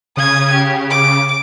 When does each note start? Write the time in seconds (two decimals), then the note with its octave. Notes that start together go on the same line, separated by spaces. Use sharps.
0.17 C#3 D#6 G#6
0.53 G4
0.91 D6